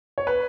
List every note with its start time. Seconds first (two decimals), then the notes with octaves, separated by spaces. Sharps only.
0.18 C#5
0.27 B4